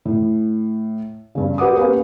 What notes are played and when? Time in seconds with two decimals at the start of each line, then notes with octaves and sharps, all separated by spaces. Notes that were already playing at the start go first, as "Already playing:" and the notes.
0.05 A2
1.35 G2 C#3
1.58 G4 B4 F#5 D6 D#6
1.77 A#3 B3 C#4 G4 B4